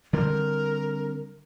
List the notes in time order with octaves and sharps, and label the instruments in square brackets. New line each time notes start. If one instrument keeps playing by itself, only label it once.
[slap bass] D3 G3 C4 [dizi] A#4